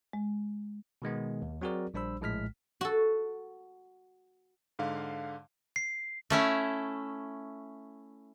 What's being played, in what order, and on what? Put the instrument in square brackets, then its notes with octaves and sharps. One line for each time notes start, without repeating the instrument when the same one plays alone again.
[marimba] G#3
[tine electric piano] B2 D#3 G#3 B3
D#2
F#3 C4 F#4 G#4 A#4 D5
A#1 G3 D4 C5 B5 E6
A#1 A2 G#3 F6 B6
[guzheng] F#4 A4
[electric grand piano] G#2 D3 F5
[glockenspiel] C7
[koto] A3 C#4 E4